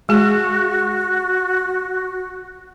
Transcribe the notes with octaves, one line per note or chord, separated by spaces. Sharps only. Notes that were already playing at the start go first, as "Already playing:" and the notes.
G#3 F#4 G#4